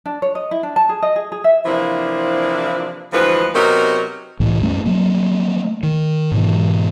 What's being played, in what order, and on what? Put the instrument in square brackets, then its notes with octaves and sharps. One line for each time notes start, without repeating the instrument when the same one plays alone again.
[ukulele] D4
C#5
D#5
E4
D4
A5
G#4
D#5
G#4
G#4
E5
[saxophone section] C3 E3 F3 A#3 D4 E4
D2 E3 F3 G#3 B4
C3 F#3 B3 D#4 A#4
[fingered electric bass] C2 A2 E3
F#2 G3 A3 C#4
F#3 A3 A#3
D#3
G#2 B2 E3